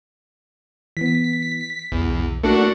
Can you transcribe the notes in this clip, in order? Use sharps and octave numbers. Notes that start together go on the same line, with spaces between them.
E3 B3 B6
B1 E2
A3 A#3 D4 F#4 A4 C#7